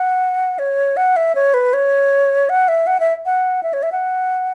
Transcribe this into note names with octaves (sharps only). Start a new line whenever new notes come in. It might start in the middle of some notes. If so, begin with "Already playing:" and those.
Already playing: F#5
C#5
F#5
E5
C#5
B4
C#5
F#5
E5
F#5
E5
F#5
E5
C#5
E5
F#5